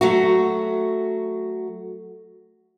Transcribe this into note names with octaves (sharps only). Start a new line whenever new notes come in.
F#3 A3 F#4